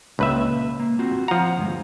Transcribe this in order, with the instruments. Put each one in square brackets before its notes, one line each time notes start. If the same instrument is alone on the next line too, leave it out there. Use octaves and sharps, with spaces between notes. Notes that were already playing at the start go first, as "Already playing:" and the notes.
[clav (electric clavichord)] C#2 B4 E5 [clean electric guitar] A#2
[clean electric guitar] A#3
C4 F4 F#4
[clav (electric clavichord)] F3 A#5 [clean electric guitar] F#5
[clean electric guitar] D2 G2 G#3